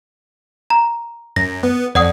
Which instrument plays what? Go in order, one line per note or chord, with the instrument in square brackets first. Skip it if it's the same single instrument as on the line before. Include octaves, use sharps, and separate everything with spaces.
[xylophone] A#5
[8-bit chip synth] F#2 [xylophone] A#6
[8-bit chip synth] B3
[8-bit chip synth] F2 [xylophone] D5 F#5 D#6